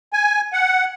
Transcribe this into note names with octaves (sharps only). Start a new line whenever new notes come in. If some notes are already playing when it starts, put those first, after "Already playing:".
G#5
F#5